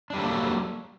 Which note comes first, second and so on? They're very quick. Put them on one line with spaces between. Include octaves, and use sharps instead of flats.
D4 G3 A4 A#3 F#3